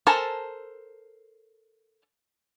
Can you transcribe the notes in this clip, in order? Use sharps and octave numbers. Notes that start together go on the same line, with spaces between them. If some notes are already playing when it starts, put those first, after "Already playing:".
A4 A#4 C5 G#5 A5